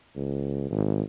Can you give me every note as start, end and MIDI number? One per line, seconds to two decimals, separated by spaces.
0.16 0.68 37
0.71 1.02 32